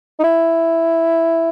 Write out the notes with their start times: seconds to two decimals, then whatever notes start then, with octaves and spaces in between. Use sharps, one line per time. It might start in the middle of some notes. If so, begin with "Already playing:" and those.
0.19 D#4
0.24 E4